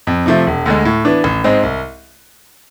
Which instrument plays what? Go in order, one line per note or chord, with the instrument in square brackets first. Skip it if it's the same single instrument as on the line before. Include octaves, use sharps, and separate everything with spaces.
[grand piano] F2
C3 F3 A3
E1
D2 D3 G#3
A2
E3 B3 D4
A1
G#2 G#3 C4
C2